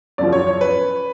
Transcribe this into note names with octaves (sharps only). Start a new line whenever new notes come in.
F#2 C#3 F3 D5
C#5
C#5
B4